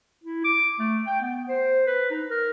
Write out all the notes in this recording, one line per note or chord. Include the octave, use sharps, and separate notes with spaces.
E4
D6
A3
G5
B3
C5
B4
D#4
A#4